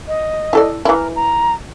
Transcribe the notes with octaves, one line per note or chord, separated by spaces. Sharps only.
D#5
E4 A4 D5
E3 E4 A#4
A#5